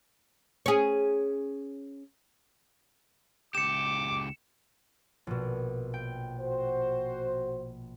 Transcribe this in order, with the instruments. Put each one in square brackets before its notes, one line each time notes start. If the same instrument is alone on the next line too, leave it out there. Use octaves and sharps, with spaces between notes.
[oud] C#4 G#4
[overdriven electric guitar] C#2 G4 [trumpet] D6 [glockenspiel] C#7 E7
[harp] A#1 B2
G5
[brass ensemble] F#4 C5